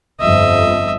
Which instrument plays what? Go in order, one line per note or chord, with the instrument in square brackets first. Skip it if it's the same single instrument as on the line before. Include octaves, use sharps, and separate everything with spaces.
[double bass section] G1 F2 F3 [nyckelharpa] D#5 E5